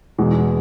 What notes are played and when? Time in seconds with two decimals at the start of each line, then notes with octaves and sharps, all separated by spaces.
0.18 E2 B2 G#3